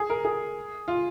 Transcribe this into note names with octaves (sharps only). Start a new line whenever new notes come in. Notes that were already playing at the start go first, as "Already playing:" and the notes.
Already playing: G#4
A#4
G#4
F4